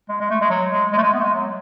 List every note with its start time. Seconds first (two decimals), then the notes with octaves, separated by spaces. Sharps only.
0.09 G#3
0.20 G#3
0.30 A3
0.41 G#3
0.50 F#3
0.71 G#3
0.93 G#3
0.97 A3
1.03 G#3
1.13 B3
1.20 A3
1.23 G#3
1.34 F#3